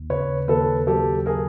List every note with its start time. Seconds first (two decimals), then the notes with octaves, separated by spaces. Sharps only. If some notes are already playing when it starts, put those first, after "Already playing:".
Already playing: D#2
0.10 C#3 B4 C#5
0.48 D#2 A4 B4
0.87 F#3 G4 A4
1.26 G#4 A#4